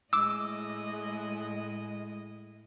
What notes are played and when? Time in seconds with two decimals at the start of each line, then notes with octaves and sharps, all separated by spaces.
0.13 A2 G#3 E4 D#5 D6 E6